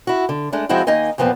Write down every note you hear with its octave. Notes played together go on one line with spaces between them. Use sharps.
E4 F#4
D3
G#3 A3 D4
F3 G#3 C4 E4 F#4
D#2 A#3 D#4 D#5 G#5
E2 A#2 F3 B3 C4